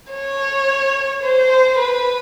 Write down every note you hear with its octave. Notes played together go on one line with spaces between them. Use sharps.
C#5
C5
B4